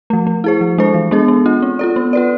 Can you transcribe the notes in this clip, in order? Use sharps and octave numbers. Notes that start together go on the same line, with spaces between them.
F3 A3
A3
E4 G#4 C5
F3
G#3 D4 A4 C5
E3
G#3 B3 D4 G#4
B3
D4 F4
C4
F4 A4 D5
B3
F4 B4 D5